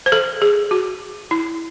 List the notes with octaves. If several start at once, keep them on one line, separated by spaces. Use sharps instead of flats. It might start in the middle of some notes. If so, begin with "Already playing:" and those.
C5
A4
G#4
F#4
E4